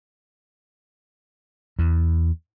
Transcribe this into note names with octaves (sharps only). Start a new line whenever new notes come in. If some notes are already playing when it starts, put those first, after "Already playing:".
E2